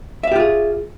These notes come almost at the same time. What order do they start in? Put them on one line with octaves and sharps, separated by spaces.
E5 F5 G4 F4 G#4